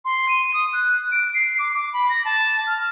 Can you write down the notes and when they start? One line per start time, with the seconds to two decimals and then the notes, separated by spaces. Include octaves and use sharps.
0.05 C6
0.29 D#7
0.54 D#6
0.73 F#6
1.12 D7
1.35 C7
1.59 D6
1.74 D6
1.93 B5
2.09 A#6
2.25 A5
2.67 F6